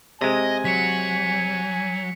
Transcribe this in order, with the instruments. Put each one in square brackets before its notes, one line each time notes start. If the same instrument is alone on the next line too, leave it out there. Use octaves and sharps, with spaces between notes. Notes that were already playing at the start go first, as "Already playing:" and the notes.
[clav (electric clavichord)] C3 G#3 [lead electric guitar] D#5 [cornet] G#5
[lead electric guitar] F#3 [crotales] B6 C#7